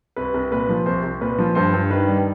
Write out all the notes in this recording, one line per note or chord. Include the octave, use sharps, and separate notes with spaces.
C2 B4
C2
A#2 B4
F3
C2 C5
C2
A#2 B4
F3
G2 C5
G2
D#3 B4
G3